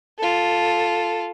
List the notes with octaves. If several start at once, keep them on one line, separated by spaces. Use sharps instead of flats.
F4 A4